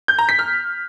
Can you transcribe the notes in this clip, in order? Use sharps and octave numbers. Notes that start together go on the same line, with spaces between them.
G6
A#5
B6
F6